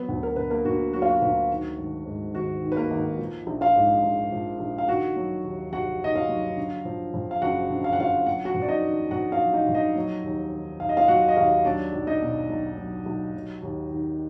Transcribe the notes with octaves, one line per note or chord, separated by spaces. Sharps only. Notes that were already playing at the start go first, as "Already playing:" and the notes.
Already playing: F#3 B3 B4
D2
A#4
D3 B4
A#3 A#4
D2 F#4
F#3 F#4
F4
F#4
D2 F#4
D#3
G#1
G#2
G#1 F#4
D#3
B4
A#3 A#4
G#1
F3
A#1
F4 F5
G#2
A#1
F3
A#1
F5
D#3 F#4 F#5
F#3
D#2
F1 F#4 F#5
D#3 D#5
F4 F5
F#3
D3
F3
F2
F5
F#1 F#4 F#5
D3
F5
F#5
F3 F4 F5
F#3 F#5
F#4 F#5
F2
D5
D#4 D#5
D#3
F2 F#4 F#5
F4 F5
F#3
D#4 D#5
F2
D#4 D#5
F#3
D#2
D#3
D#2 F5
D#5
F4 F5
F#3 F#4 F#5
D#5
D#2 F4 F5
F#3 D4 D5
B1
D#4 D#5
B2
B1
F#3
B1
F#3
D#2
D#3